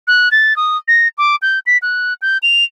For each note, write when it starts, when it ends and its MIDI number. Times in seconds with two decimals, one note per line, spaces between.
0.08 0.29 90
0.32 0.56 93
0.56 0.77 87
0.88 1.08 94
1.18 1.36 86
1.42 1.59 91
1.66 1.78 95
1.82 2.14 90
2.22 2.38 91
2.43 2.64 101